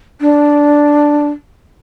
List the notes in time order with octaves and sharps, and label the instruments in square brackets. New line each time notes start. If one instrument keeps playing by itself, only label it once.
[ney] D4